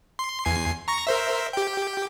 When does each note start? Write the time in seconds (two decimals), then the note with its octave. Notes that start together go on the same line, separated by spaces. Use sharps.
0.19 C6
0.45 E2 G#5 C7
0.88 A#5 C#6 A#6
1.07 A#4 C5 E5
1.53 G4 G5